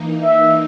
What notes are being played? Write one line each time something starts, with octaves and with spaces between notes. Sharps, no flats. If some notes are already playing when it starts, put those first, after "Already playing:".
Already playing: E3 A#3 D#4
E5